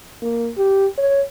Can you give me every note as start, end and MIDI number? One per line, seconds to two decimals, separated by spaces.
0.22 0.50 58
0.57 0.86 67
0.98 1.21 73